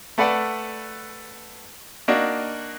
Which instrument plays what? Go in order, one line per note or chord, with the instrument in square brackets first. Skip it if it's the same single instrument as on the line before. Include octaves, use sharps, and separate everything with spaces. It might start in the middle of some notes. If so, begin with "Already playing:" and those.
[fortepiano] A3 A4 B4 D5 F#5
A#3 D4 D#4 F#4